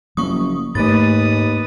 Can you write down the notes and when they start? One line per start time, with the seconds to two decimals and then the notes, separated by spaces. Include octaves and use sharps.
0.17 F#1 F3 A#3 C#6 D#6
0.75 D#2 G#2 A3 B4 D#6 A6